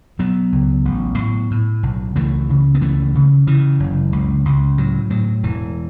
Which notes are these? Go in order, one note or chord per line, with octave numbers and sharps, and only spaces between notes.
B2 F#3 B3
C#2
A1
A2
A2
B1
C#2 E3 A3
C#3
B3
C#2 E3 A3
C#3
C#3 E3
F#1
C#2
C#2
A2 F#3
A2 F#3
E1 E3